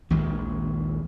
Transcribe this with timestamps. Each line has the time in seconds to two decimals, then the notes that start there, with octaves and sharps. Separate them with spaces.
0.10 A#1 D#2 D#3 G#3